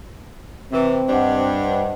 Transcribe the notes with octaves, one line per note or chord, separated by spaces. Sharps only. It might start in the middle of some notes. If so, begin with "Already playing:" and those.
C3 E3 C4
G2 D4 C5 D#5 F#5